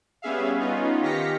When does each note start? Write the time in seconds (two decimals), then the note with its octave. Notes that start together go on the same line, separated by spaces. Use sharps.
0.22 G3 B3 C#4 G#4 E5 F5
0.60 B3 C#4 D#4 F4
1.01 D#3 G4 F5 A#6 B6 C#7